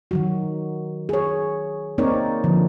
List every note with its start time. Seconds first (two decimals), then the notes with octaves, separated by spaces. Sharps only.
0.11 D#3 F#3 F#4
1.09 G#4 C#5
1.98 A#3 C4 D#4 A#4 C#5 D5
2.44 D3 F3